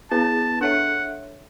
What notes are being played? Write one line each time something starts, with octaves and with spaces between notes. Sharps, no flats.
B3 E4 G#4 B4 A5
D4 A4 C#5 E5 F#5